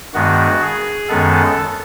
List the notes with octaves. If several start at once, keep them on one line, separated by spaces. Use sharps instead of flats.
G2 D#3 G#3 B3 F#4
G#4
F#2 D#3 G#3 B3 A4